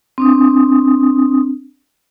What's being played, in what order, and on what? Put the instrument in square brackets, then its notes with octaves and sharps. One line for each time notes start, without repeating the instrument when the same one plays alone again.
[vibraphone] C4 D4 D#6